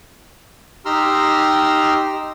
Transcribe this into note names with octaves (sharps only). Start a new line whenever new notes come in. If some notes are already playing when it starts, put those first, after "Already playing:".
D#4 G4 A#5 C6 E6 F6